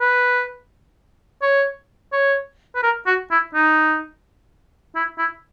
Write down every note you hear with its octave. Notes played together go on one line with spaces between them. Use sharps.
B4
C#5
C#5
B4
A#4
F#4
E4
D#4
E4
E4